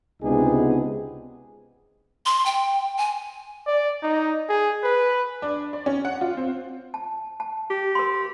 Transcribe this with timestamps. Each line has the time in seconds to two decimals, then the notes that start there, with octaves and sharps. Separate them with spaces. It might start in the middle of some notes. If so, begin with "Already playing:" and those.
0.22 C#2 C3 B3 D4 D#4 G#4
2.26 C6
2.46 G5
2.97 G#5
3.67 D5
4.03 D#4
4.49 G#4
4.83 B4
5.42 D4
5.73 D5
5.86 C#4
6.05 F#5
6.21 F4
6.37 C4
6.94 A5
7.40 A5
7.70 G4
7.95 A#4 C6